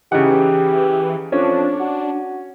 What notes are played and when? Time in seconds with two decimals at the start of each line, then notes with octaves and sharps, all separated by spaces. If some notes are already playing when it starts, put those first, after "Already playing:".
0.12 C#3 E3 D#4 G4 F#5
1.32 F2 C#4 D4 C#5
1.80 F#4